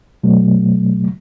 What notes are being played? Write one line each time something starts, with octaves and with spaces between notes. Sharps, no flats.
B2 F#3 A3